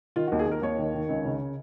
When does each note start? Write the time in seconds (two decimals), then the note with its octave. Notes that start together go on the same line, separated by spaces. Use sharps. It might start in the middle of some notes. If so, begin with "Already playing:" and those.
0.16 D#3 F4
0.28 F#4
0.32 D#2
0.39 G#4
0.47 D#2 A#4
0.62 D#2 C#5
0.78 D#3
0.94 D#3
1.09 C#2
1.25 C#3